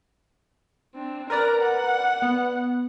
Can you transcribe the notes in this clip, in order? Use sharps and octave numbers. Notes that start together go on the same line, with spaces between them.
C4 D4
A#4 B4 D5 A#5
F#5
B3